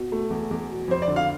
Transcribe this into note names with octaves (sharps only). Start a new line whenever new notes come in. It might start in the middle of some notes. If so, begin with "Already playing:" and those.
Already playing: B2
A3
E2
E2
B2
F2 C5
D5
D3
F5